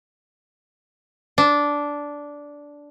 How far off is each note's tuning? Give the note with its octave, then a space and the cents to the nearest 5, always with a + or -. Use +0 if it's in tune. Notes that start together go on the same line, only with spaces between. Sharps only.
D4 -10